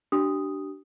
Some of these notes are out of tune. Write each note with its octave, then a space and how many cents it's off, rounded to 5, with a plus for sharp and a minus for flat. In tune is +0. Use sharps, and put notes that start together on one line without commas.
D4 +0 G4 -40 D#6 +0